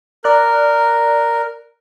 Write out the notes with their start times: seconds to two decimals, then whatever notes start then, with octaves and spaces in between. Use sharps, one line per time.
0.24 A#4 D5 A#5 F#6